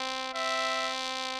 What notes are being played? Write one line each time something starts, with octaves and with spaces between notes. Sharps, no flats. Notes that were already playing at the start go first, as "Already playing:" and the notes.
Already playing: C4
C4 E5